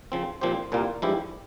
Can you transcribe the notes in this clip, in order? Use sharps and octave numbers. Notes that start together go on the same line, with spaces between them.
C#3 F3 C4
A#2 F3 C4 G4 C5
C2 A#2 G3 A#3 F4
G2 F3 G#3 E4 G4